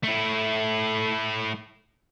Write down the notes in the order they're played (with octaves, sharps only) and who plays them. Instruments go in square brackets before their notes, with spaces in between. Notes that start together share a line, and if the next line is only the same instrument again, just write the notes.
[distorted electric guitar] A3 E4